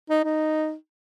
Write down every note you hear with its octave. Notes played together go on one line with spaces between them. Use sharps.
D#4
D#4